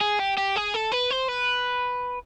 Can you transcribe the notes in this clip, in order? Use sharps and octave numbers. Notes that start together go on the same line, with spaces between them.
G#4
G4
G4
G#4
A4
B4
C5
B4